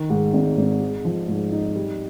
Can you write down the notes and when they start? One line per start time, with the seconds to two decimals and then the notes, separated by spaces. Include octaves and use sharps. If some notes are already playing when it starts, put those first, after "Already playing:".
Already playing: D#3
0.10 G#2
0.33 G#1
0.57 G#1
0.81 G#3
1.05 F3
1.28 G#2
1.52 D#4
1.75 G3